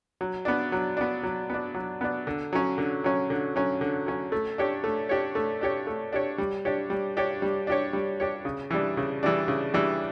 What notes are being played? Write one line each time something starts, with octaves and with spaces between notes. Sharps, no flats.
F#3
B3 D4
F#3
B3 D4
F#3
B3 D4
F#3
B3 D4
D3
F#3 C#4
D3
F#3 C#4
D3
F#3 C#4
D3
F#3 C#4
A3
D4 G4 C#5
A3
D4 G4 C#5
A3
D4 G4 C#5
A3
D4 G4 C#5
G3
D4 G4 C#5
G3
D4 G4 C#5
G3
D4 G4 C#5
G3
D4 G4 C#5
C#3
E3 G3 D4
C#3
E3 G3 D4
C#3
E3 G3 D4